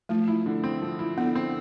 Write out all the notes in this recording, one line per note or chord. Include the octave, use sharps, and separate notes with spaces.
F3 A3
E4
D3
C4
F3
E4
D3 B3
C4